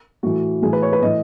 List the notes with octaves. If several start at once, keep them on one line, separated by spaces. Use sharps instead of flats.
A2 E3 F#4
A2 E3 G#4
B4
C#5
B4
A2 E3 D#5